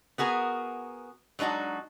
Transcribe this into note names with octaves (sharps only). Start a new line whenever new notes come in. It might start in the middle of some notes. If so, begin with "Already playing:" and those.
B3 F#4 G#4 A#4
F#3 G#3 D4 D#4 F#4